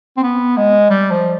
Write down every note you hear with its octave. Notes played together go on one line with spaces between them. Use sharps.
C4
B3
G#3
G3
F3